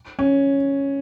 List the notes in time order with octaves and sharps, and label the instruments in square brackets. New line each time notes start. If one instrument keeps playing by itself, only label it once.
[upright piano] C#4